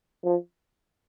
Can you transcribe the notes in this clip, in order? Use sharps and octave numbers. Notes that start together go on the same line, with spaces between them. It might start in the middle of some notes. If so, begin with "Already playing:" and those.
F3